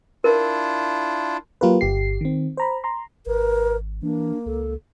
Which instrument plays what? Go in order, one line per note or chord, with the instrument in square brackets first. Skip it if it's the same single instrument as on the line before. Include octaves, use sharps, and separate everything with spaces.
[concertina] D4 E4 F4 [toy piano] A#4
[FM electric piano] F#3 A#3 F4 G4 A#4 B4
G1 G4 C7
D#3 C4
C5 A#5 B5
A#5 C6
[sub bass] G#1 [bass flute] A#4 [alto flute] B4
[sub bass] E3 [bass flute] A#3 [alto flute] D4
[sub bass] C#2 [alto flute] A4